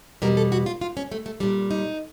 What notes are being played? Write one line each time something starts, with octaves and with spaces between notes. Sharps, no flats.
E2 B2 G3 A#4
A4
F#4
F4
F4
C#4
A3
A3
A#2 G3 D4
D#4